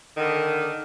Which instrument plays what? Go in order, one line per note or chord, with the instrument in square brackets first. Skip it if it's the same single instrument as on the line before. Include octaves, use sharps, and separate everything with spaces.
[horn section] D3 D#3